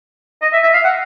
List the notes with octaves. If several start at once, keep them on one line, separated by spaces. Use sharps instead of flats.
D#5
E5
E5
F5
F#5